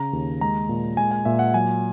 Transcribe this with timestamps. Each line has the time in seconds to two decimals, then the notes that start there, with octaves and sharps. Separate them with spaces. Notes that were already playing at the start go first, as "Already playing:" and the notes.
Already playing: C#3 A#5
0.13 D#2
0.41 G#3 A#5
0.69 A#2
0.97 G#3 G#5
1.11 G#5
1.25 A#2 E5
1.39 F#5
1.54 F#3 G#5